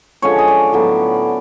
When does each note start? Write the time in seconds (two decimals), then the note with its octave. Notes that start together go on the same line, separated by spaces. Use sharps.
0.22 D3 F3 G#3 C#4 C#5
0.39 D#5
0.48 D5
0.73 A2 F#3 B3